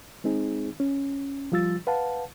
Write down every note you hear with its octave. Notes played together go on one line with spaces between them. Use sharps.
G#3 C4 D#4 G#4
C#4
F3 G3 F4 E6 A6
B4 F5 F#5 A5